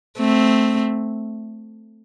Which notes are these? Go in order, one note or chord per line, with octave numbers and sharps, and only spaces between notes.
A3 C4